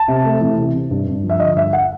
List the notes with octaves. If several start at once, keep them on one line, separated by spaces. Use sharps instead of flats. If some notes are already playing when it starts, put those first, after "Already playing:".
Already playing: A5
C3
A3
E3
C3
C3
G2
G2
F3
E5
D3 D#5
G2 E5
F#5